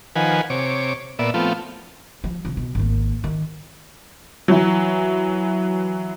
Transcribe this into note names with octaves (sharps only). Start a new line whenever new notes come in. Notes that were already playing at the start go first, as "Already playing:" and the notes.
D#3 F3 B4 F#5 G#5
C3 C#5 D6
A#2 B3 D5 E5
F3 A3 B3 C4 F4
F3
C3 F3
B2
G#1 A#3
D#3
E3 F#3